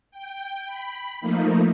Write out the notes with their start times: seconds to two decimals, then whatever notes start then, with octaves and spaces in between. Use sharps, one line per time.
0.11 G5
0.66 B5
1.20 F3 A3 A#3 D#4